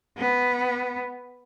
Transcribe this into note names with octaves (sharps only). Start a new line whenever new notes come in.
B3